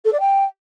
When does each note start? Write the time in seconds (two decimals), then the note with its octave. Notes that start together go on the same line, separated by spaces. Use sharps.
0.05 A4
0.12 D5
0.20 G5